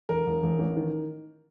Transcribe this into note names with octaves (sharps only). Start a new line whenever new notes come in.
E1 A#4
E1
E1
A1
D#3